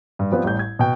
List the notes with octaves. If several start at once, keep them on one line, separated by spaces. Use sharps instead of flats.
G2
F3 G3 B3 C4
A1 G3 G6
G#6
B2 G5